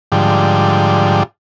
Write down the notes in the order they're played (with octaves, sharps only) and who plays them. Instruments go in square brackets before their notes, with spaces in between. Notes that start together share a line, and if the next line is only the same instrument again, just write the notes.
[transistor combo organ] G#2 D3 F3 G3